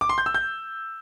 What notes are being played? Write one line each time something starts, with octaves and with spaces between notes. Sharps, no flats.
D6
C6
G6
E6
G6